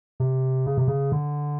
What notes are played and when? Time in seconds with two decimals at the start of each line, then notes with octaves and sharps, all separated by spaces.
0.20 C3
0.66 C#3
0.78 C3
0.88 C#3
1.12 D3